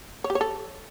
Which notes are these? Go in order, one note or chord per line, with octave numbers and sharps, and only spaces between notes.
C#5
G4
C#5
A4